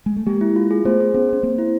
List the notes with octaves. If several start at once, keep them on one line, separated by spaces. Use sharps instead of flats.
G#3
A3
G#3 A#3 G4
E4
F4
G#4
A3 B3 C5
G#4
B3 C#4 C5
C#4 C5
A#3 C4 C5
E4